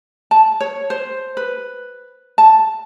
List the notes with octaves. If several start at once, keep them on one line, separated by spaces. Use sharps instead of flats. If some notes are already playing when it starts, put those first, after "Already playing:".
A5
C#5
C5
B4
A5